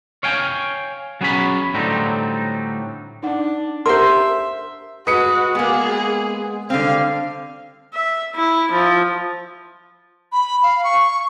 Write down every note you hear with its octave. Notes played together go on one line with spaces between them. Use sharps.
C#5 F5 G5 G#5
F#3 B3 C#4 G#4 C#5 B5
A2 D3 F#3 G3 C4 D#4
D4 D#4 F#5
G4 A#4 C5 E5 F#5 A5 C6
G#3 F#4 B4 D#6 C#7
G#3 A#3 B3 G#4
D3 G3 C4 F5
E5
E4
F3
B5
F5
C#6